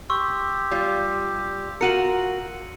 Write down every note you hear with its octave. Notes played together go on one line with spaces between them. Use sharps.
G4 C6 C#6 E6
G3 F4
F4 F#4 A#4 C#7 D#7 F#7